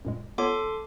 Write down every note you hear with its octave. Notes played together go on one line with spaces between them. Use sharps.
F#2 A#2 G#3
B3 F4 A4 C#5 C6 D6